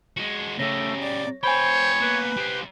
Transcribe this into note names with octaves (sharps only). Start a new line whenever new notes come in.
G#3 F#4
C#3 A3 G4 C#5 A#6
D5
B3 C5 C#5 G5 G#5 B5
A#3 B3 B4
G3 C5